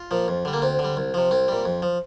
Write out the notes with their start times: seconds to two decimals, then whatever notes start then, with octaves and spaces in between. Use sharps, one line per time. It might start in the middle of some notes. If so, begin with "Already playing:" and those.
Already playing: F4
0.11 A#2 F3
0.28 F2
0.45 D3 G3
0.53 A#3
0.62 D2 C4
0.79 D3
0.84 G3
0.97 C2
1.14 C3 F3
1.31 C2 C4
1.48 A#2 G3
1.65 F2
1.82 F3